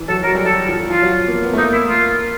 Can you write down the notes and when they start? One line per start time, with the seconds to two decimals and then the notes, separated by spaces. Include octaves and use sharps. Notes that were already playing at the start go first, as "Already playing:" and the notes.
Already playing: E3
0.08 F#3 A4
0.23 F#3 A#4
0.35 G3
0.45 F#3 A4
0.68 F3
0.79 F3
0.90 F3 F4
1.02 F#3
1.28 A#3
1.43 B3
1.53 A3
1.58 A#3 D#4
1.73 E4
1.88 F4